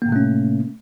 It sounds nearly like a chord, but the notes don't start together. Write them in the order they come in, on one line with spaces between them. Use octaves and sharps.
A#3 A2 C3 A3 C#4